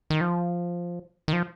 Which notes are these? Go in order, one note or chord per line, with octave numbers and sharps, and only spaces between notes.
D#3
F3
D#3
F3